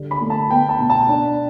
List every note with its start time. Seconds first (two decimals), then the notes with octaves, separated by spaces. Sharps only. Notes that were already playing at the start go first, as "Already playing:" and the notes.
Already playing: D3 G3
0.11 B5
0.21 A3
0.30 A5
0.50 B3 G5
0.69 A5
0.79 B2
0.90 A5
1.09 D4